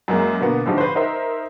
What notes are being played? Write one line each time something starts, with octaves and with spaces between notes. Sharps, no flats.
F#2 G#3 A#3
B2 D3 A#3 B3
A2 D3 F3 D#4 G4
B4 C5
D#4 A#4 C5 E5